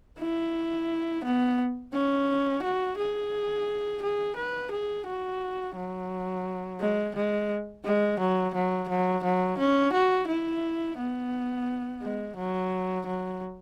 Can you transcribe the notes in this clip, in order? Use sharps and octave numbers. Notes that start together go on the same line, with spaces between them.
E4
B3
C#4
F#4
G#4
G#4
B4
G#4
F#4
F#3
G#3
G#3
G#3
F#3
F#3
F#3
F#3
C#4
F#4
E4
B3
G#3
F#3
F#3